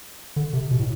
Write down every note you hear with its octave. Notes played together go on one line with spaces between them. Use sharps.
D3
C3
B2
A2